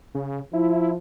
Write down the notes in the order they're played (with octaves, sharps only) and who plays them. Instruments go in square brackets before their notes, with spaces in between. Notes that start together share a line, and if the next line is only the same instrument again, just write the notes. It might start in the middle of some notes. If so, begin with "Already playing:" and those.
[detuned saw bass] C#3
[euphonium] F3 [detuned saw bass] E4